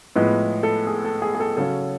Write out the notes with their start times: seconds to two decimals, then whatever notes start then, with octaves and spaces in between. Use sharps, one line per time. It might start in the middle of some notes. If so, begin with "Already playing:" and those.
0.16 A2 F3 G#3 B3 B4
0.63 A4
0.87 G#4
1.05 A4
1.22 G#4
1.35 G#4
1.40 A4
1.57 C#3 F#3 C#4 A4